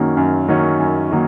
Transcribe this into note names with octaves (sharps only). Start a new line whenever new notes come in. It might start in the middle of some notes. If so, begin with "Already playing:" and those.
Already playing: F#2 D#3 F#3 A#3 C#4
F#2
D#3 F#3 A#3 C#4
F#2
D#3 F#3 A#3